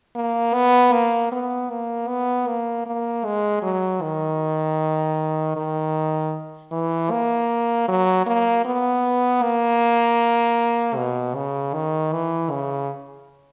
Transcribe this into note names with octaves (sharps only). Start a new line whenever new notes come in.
A#3
B3
A#3
B3
A#3
B3
A#3
A#3
G#3
F#3
D#3
D#3
E3
A#3
F#3
A#3
B3
A#3
B2
C#3
D#3
E3
C#3